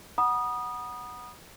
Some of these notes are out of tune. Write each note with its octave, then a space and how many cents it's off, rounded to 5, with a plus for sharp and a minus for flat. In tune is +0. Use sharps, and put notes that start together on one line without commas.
F#5 +0 B5 -40 D#6 -15